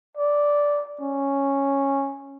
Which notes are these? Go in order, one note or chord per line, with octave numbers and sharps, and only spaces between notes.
D5
C#4